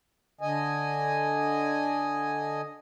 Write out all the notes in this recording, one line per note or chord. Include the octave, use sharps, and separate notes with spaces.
D3 D#5 G#5